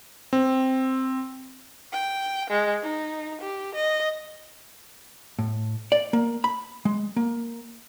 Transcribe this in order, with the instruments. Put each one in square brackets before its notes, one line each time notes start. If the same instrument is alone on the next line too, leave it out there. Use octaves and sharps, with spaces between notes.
[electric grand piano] C4
[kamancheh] G5
G#3
D#4
G4
D#5
[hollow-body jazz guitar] A2
D5
A#3
B5
G#3
A#3